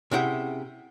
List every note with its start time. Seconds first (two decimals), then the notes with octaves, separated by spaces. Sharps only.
0.11 C3 C#4 E4 G#4 F#5 G5